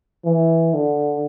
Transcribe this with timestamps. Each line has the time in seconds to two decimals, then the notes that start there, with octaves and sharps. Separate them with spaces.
0.25 E3
0.74 D3